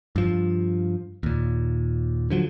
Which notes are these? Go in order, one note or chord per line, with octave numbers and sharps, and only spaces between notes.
G2 F3
D#2 A#2
D3 F3 F#3